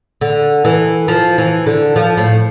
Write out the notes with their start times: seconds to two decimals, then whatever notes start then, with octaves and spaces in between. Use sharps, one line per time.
0.21 D3
0.65 E3
1.08 F3
1.38 E3
1.67 D3
1.96 F3
2.17 A2